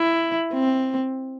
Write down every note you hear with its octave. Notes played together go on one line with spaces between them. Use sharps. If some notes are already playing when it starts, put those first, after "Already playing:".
Already playing: E4
C4